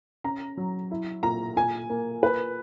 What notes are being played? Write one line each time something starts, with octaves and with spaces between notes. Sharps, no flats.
C#4 A#5
F#3
E4
A#2 A#5
A#2 G#5
A#3
A#3 B4